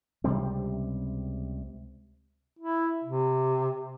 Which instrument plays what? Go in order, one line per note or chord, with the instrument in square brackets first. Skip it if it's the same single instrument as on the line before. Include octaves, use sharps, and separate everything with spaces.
[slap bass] C#2 C3 G3 C4
[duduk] E4
C3